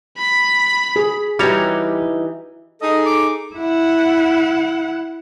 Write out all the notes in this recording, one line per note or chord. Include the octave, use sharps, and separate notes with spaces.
B5
G#4
E3 G3 D#4 F#4 G4 C#5 A#5
D#4 G#4 A4 D#5
D6
E4 F#5